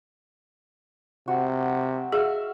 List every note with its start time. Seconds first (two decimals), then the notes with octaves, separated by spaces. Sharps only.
1.28 C3 F#4
2.12 F#4 G#4 E5 F5